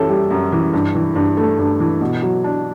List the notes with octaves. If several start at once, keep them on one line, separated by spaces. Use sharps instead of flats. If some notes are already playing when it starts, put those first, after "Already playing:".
Already playing: F#2 E3 C#4 G4 A4 E5
G3
F#2
E3
G2
E3
G2
A3 A4
G2
E3
B2
F#3
D4